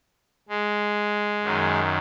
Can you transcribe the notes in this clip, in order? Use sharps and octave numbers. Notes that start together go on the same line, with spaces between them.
G#3
F#2 D#3